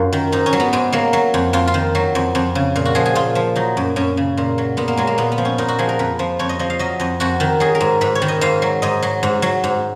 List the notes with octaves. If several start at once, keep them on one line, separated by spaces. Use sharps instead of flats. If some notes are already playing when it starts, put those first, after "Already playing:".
Already playing: F#2 F#3 F4 A#4
D#3
G#2 D#4
C#4
F#3
B3
G#2 G#3
F#3 A#3
F#3
F2
F2 F4
F4
D#3
F#3
F2
F2
C#3
A#2
F#4
F3 G#4
G#4
A#2 F4
F3
F#3 D#4
F#2
F#2 C#4
C#3
A#2
F#3
A#2 B3
A#3
F#3 G#3
A#3
A#2 B3
B3
F3
C#4
A#2 D#4
F#4
F3 G#4
A#4
F2 B4
F3
F2 C#5
D#5
F3 D#5
F5
F#3 D#5
F2 D#5
F2 F#4
D#3
F#3 G#4
A#4
G#2
G#2 B4
C#5
D#3
D#5
G#2 F5
F#3
G#2 D#5
F#3
G#2
F#3
G#2